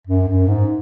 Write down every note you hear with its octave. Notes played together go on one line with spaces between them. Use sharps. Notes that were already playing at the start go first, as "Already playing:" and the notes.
F#2
F#2
G#2